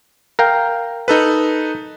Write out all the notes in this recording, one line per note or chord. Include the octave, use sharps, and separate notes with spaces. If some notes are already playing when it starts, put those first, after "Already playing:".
A#4 F5 G5
D#4 A4 B4